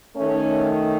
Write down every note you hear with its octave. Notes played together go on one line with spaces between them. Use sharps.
D#3 A3 C#4